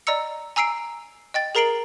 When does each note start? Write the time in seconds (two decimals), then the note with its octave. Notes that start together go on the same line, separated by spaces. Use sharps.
0.07 D5 D#5 A#5 E6 C#7
0.56 G#5 A#5 E6 C7 D7
1.34 D#5 G5 A6
1.55 G#4 A#4 A#5 C7 D7 F#7